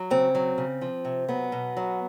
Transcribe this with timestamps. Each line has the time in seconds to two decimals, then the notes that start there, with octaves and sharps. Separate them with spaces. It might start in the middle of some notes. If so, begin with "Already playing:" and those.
Already playing: F#3
0.10 C#3 C4
0.35 F#3
0.58 C#3
0.82 F3
1.05 C3
1.29 F#3 B3
1.52 B2
1.77 F#3